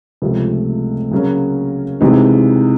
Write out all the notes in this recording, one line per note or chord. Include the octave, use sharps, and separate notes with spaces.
C#2 C3 F3 A3 C4
C#3 F#3 A#3 C#4
C3 E3 G#3 C4 D#4